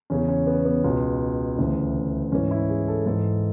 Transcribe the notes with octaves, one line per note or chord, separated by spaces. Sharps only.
E2 C#3 E3 C#4
C#4
B3
B3
C#2 B2
D2 C#3 E3
G#2 E3 C#4
E4
G#4
A4
G#2 E3 A4